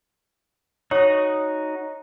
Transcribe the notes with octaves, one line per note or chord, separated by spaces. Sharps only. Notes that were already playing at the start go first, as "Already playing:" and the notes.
D#4 F#4 C#5 D#6